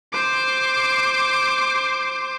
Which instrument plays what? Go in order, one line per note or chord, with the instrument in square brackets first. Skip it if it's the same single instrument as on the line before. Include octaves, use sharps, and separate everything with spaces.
[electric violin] C5 D6